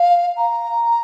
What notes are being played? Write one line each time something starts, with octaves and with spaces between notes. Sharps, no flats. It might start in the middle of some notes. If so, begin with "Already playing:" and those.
Already playing: F5
A#5